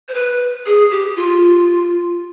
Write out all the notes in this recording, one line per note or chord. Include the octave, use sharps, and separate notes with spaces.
C5
B4
G#4
G4
F4